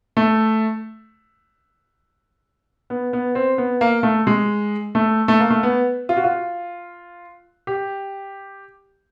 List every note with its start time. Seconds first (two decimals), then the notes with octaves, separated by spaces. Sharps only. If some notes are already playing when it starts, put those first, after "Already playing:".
0.17 A3
2.90 B3
3.13 B3
3.35 C4
3.58 B3
3.81 A#3
4.03 A3
4.27 G#3
4.95 A3
5.28 A3
5.40 A#3
5.50 A3
5.63 B3
6.09 F4
6.17 F#4
6.24 F4
7.67 G4